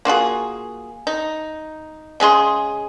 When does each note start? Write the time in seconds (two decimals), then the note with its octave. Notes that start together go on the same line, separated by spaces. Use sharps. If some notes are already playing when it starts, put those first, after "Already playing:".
0.05 A#3 F4 F#4 G#4
1.07 D#4
2.20 C#3 G#3 G#4 C6